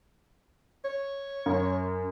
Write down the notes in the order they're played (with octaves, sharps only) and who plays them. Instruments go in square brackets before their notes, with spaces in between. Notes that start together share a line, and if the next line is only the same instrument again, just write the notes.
[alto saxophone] C#5
[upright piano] F#2